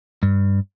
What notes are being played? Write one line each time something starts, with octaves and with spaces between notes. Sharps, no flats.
G2